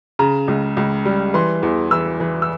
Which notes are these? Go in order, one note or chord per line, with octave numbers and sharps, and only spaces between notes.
C#3 A#5
C#2
C#2
G3
E3 C6
E2
E3 E6
E3
E6